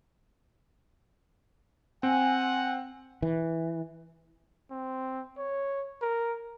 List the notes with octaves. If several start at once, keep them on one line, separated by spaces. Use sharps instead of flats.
C4 F#5 G#5
E3
C4
C#5
A#4